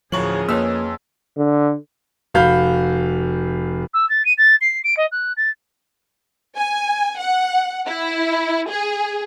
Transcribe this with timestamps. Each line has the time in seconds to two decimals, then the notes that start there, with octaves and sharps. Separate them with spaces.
0.12 D1 F3 C#4 G#4 A#4 C#5 F#7
0.49 F2 A#3 B4 C#5 E6
1.37 D3
2.34 F1 F#4 F5 B5 G6
3.93 E6
4.09 A6
4.25 D#7
4.38 A6
4.61 C7
4.84 D7
4.97 D#5
5.12 F#6
5.37 A6
6.56 G#5
7.19 F#5
7.87 E4
8.70 G#4